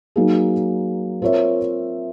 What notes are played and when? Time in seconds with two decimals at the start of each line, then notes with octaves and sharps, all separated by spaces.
0.16 F#3 A#3 D#4 G#4
1.22 C4 F4 A#4 C#5 E5